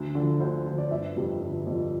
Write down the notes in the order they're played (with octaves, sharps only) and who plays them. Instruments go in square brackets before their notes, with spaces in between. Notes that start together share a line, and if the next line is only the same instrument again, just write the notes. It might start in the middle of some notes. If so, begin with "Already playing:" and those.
Already playing: [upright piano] D2
D3 F3
D2 C5
D3 F3 C5
D5
G1 E5
F2 C3 G3
G1
F2 C3 G3